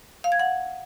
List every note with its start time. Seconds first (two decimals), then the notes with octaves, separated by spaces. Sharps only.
0.24 F5
0.32 G#6
0.39 F#5